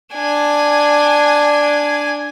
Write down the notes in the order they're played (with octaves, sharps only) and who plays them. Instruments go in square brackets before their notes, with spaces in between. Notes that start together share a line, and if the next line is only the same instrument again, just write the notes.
[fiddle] D4 G#5